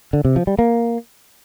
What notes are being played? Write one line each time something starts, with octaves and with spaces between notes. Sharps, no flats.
D3
C3
F3
G3
A#3